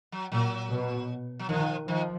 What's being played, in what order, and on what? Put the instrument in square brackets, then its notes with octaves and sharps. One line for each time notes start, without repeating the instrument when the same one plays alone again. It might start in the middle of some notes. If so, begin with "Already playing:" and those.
[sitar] F#3
[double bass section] A#2 [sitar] F#3
[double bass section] B2
[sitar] F#3
[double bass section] D#3 [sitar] F3
[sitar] D#3 [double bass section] F3